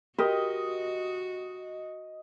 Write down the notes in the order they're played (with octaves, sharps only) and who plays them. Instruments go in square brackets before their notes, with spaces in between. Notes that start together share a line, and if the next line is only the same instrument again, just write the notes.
[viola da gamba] F#4 [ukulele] G4 A#4 [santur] D#5